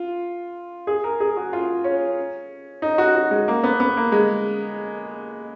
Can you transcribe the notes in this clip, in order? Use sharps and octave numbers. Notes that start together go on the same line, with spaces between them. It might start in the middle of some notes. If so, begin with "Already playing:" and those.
Already playing: F4
G#4
A#4
G#4
F#4
F4
C#4
D#4
F#4
F#4
G#3
A#3
B3
B3
A#3
G#3